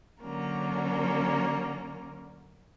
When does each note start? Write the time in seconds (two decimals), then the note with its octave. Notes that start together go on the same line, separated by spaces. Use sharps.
0.21 D3 F#3 A#3 C#4 A#4